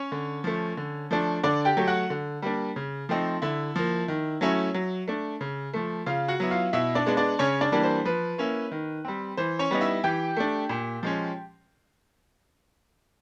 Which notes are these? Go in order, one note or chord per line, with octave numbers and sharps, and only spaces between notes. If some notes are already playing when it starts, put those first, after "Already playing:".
Already playing: C#4 C#5
D3
F3 A3
D3
F3 A3 D4
D3 D4 D5
G4 G5
F#3 A3
F#4 F#5
D3
G3 A#3 D4
C#3
F3 A3 C4 D#4
D3 E4 E5
F3 A#3
D#3
F#3 A3 C#4 E4
F#3
A3 D4
C#3
F3 A3
C#3 F4 F5
F#4 F#5
F#3 B3 E4
F4 F5
B2 E4 E5
D4 D5
G#3 B3 D4
D4 D5
C#3 C#4 C#5
D4 D5
E3 G3 A#3 D4
C5
F3 B4
A#3 C#4 E4
D#3
G3 C4
E3 C5
C#4 C#5
G3 B3 D#4
E4 E5
E3 G4 G5
A3 D4
A#2
F3 G#3 C#4